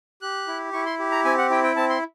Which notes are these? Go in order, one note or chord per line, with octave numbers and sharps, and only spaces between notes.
G4 F#6
E4
E4 C#6
C6
G4
A#5
C4 G#5
F#5
E4 G5
G5
C4 A5
C6